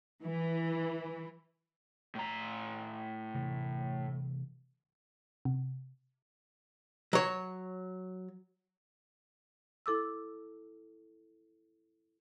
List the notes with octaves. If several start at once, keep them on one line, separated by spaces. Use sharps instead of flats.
E3
A2 A#5
C3 E3 A3
C3
F#3 C#5
E4 A4 D6 E6